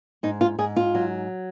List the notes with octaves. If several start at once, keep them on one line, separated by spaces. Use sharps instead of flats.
G#2 D#4
F4
G#2 G#4
F4
F#3